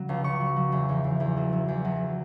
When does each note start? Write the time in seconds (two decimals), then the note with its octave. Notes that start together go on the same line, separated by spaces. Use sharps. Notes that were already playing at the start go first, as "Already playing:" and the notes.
Already playing: C#3 F#3
0.09 C#2
0.24 C#2 C#6
0.40 F#3
0.56 F#3
0.72 E2
0.89 E2
1.04 E2
1.20 E2
1.37 F#3
1.53 F#3
1.68 E2
1.85 F#3